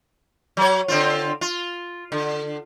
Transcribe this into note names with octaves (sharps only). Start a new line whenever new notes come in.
F#3 C#5
D3 C4 F4
F4
D3